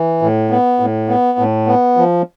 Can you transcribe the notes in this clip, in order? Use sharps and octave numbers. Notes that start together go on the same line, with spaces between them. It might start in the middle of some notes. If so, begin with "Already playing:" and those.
Already playing: E3
A2
B3
A2
B3
A2
B3
F3